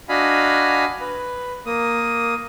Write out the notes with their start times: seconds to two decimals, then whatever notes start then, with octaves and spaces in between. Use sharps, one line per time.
0.09 D4 F#4 D#5 F5 G#5 B5
1.01 B4
1.66 A#3 D#6